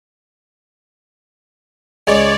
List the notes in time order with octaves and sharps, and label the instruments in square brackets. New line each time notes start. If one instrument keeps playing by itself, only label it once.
[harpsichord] C#2 G#3 [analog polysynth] C#5 D5